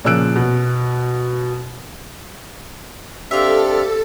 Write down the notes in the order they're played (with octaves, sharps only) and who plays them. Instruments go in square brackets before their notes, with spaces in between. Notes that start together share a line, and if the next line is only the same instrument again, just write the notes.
[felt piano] A#2 C#3 F3 E6 F#6 D7
B2
[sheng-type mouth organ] C4 D4 F6 [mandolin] F4 E5 [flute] G4 [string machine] A4